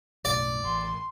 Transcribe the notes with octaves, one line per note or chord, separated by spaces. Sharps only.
B1 F#2 A2 D5
A1 C6